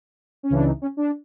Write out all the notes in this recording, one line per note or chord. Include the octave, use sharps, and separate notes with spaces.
C#4
C#2 C#3 E3 D4
D#4
C#4
D4